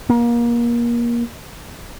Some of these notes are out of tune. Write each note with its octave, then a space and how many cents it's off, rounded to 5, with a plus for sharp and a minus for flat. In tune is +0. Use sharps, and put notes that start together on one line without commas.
A#3 +25